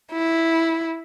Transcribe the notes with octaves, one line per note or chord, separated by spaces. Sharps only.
E4